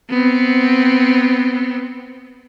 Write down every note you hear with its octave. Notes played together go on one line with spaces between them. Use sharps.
B3 C4